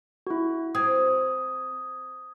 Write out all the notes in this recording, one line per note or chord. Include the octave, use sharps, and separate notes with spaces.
E4 F#4
C4 D#6 G#6